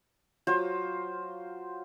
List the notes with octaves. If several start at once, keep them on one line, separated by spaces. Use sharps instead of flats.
F#3 F4 C5